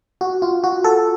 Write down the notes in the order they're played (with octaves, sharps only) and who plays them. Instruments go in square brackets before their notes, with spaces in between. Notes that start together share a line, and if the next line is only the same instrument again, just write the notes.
[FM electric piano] F#4
F4
F#4
A4